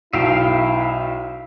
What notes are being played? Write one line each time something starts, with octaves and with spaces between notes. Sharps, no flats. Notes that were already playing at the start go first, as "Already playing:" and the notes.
B1 E4 E5 F5 G5